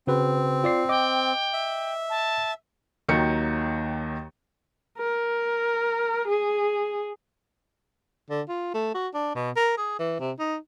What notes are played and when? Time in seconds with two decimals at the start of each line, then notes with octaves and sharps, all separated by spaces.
0.07 C#3 C4 F#4 B4
0.64 F4 D5 C7
0.89 D#5 G5 D6
1.53 E5
2.10 A5
3.09 D#2 D#3 F#3 C#7
4.98 A#4
6.28 G#4
8.30 D3
8.49 F4
8.74 A3
8.95 F#4
9.14 D4
9.36 B2
9.56 A#4
9.77 G#4
9.99 E3
10.20 C3
10.39 D#4